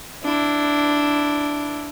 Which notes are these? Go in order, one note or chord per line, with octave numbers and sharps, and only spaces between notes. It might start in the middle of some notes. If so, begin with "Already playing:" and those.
D4 E4